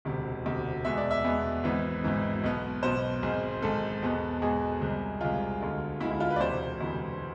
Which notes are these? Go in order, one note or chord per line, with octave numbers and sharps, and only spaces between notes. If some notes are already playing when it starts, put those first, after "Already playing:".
E1 D2 C3
E1 D2 C3
E2 B2 G#3 B3 E5
D5
E5
E2 B2 G#3 B3
G#1 G#2 E3 B3
G#1 G#2 E3 B3
B1 B2 B3
B1 B2 B3 C5
G#1 G#2 G#3
G#1 G#2 G#3 A4
E2 B2 G#3 B3
E2 B2 G#3 B3 G#4
C2 C3 G#3
C2 C3 G#3 F4
D2 D3 G#3
D2 D3 G#3 E4
E4
F4
B4
D5
E1 D2 C3 E3 C5
E1 D2 C3 E3